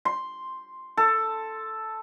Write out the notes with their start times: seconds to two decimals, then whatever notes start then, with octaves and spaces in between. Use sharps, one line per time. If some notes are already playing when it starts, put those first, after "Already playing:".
0.05 C6
0.97 A4